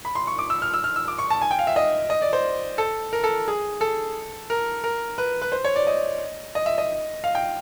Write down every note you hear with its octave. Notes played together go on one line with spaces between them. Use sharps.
B5
C6
C#6
D6
E6
F6
E6
F6
E6
D6
C#6
A5
G#5
G5
F5
E5
D#5
D#5
D5
C5
A4
A#4
A4
G#4
A4
A#4
A#4
B4
B4
C5
C#5
D5
D#5
D#5
E5
D#5
F5
G5